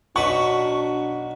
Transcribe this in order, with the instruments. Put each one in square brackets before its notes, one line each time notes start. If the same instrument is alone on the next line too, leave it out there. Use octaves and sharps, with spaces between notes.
[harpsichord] B1 F#4 B4 [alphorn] D4 [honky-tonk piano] C#6